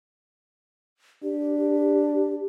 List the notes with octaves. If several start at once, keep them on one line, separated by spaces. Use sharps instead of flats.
D4 G4